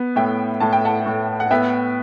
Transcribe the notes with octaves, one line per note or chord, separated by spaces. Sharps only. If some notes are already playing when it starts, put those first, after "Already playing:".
Already playing: B3
A2 E5 G5
A2 A5
G5
F#5 A5
A2
F#5
B3 E5 G5